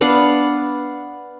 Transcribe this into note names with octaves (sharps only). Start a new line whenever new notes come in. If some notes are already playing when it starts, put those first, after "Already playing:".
B3 D4 F5 F#5